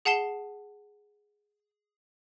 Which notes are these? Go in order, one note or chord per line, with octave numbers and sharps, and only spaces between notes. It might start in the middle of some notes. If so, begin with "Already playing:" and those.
G#4 F#5 A5 C7 E7 G7